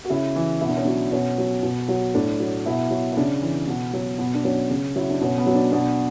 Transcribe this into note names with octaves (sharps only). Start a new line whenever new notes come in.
F#4
C#3 E4
E3
B2 E4
D4
C#4
F#3 D4
B2 C#4
F#3
B2
F#3
A2 D4
F#3
B2 E4
F#3
E4
C#3 D4
E3
B2
F#3
B2 B3
D4
F#3 C#4
C#3
F#3 E4
D4
B2 C#4
B3
F#3
D4
B2 D4